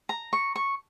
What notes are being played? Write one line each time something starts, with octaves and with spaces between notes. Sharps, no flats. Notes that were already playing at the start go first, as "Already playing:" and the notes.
A#5
C#6
C#6